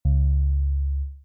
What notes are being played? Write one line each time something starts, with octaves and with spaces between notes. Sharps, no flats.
C#2